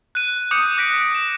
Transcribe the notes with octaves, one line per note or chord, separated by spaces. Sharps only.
F#6 D#7
D6 D#6 F#6 G6 C#7
D6 F#6 A#6 B6 D7 D#7
E7